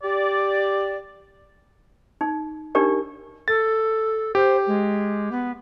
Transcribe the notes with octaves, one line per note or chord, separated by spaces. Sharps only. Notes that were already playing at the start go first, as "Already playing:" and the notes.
G4 D5
D#4
D4 D#4 G4 A#4 D5
A4 A6
G4 C5
G#3
B3